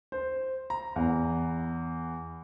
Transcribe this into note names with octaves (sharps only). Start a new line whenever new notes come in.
C5
A#5
E2